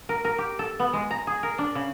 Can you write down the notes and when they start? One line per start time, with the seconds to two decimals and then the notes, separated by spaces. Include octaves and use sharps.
0.09 A#4
0.25 A#4
0.38 G4
0.59 A4
0.79 B3
0.93 G#3
1.11 A#5
1.27 G#4
1.43 A#4
1.58 D4
1.75 C#3